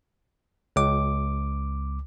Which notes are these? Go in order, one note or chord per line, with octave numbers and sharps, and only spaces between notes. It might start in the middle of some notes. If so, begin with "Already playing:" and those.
C#2 D6